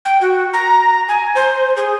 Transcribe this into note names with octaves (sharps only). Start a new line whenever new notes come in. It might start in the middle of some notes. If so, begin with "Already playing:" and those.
G5
F#4
A#5
G#5
C5
G#4